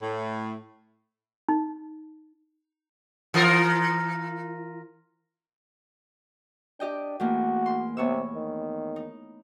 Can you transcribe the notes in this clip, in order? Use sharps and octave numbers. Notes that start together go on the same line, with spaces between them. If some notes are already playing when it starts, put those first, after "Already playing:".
A2
D#4
E3 F4 A#4
D4 G4 D#5 G5
E2 A3 A#3 F#4
C6
C3 B3 C#5 E6
D#3
D#4